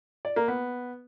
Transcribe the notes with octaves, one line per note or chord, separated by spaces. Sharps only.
D5
A#3
B3